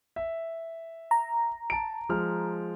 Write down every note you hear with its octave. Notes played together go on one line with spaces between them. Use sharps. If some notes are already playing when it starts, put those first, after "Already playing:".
E5
A#5
A5 D7
F3 G#3 F6